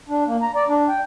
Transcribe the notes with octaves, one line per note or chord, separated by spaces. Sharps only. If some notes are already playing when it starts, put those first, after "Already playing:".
D4
A#3
A#5
D5
D4
G5